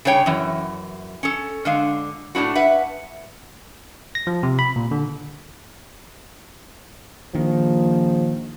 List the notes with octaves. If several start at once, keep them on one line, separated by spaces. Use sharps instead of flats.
C#3 G3 C#5 G5
F#2 E3
C#4 A4
D3 G#3 F5
A2 D4 E4 F#4
B4 E5 F#5
A#6
F3
C3
B5
A#2
D3
A#1 D#3 F3